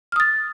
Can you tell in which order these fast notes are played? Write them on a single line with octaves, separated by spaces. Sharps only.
F6 D#6 A6